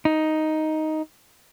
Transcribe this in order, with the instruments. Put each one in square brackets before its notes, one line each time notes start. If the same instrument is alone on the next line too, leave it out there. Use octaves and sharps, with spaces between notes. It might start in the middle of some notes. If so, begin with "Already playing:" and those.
[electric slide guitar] D#4